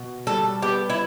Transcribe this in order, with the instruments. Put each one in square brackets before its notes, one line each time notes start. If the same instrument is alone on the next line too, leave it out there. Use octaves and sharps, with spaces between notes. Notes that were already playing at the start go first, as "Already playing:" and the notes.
Already playing: [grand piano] B2
[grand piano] G3 [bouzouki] A4
[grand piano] B3 [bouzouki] G4
[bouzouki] E4